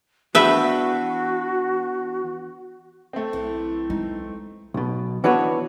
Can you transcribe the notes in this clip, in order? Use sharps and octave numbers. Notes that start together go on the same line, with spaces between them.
E3 B3 D4 F#4 B4 E5 G5
A3 C4
B1 E3
G#3 D#4
B1 B2
E3 B3 D4 F#4 B4 C#5